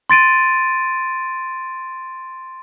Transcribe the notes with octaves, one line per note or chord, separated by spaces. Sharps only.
C6 A6 D7 D#7